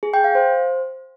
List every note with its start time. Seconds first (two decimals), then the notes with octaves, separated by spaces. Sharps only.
0.03 G#4
0.14 G5
0.24 F5
0.35 C5